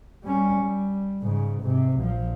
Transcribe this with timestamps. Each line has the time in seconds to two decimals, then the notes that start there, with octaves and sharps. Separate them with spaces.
0.24 G3 C#4
0.60 G3
1.22 G#2 C#3
1.61 G#2 C3
1.99 A#1 F3